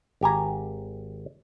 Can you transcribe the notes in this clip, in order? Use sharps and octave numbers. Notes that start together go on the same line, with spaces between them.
G#1 G4 G#5 A#5